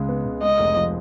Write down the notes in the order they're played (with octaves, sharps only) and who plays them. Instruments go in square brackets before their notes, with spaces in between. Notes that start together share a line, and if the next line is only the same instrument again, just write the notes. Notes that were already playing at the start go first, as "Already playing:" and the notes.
Already playing: [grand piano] C#2 C#3 G#3
B3
C#2
[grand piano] G#3 [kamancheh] D#5
[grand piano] F1
F3